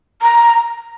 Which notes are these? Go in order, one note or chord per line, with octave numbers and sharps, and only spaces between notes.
A#5